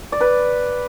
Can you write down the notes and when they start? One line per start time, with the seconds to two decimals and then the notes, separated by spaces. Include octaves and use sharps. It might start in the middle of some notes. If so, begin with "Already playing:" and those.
0.12 D5
0.21 B4